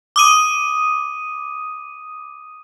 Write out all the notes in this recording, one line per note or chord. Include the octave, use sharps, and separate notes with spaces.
D6 D#6 D#7